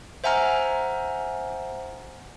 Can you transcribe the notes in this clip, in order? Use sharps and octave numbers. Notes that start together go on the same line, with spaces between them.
C5 E5 F#5 G#5 A#5 F6